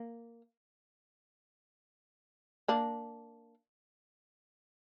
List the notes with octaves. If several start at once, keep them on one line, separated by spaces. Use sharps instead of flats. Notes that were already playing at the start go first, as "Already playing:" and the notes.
Already playing: A#3
A#3 D4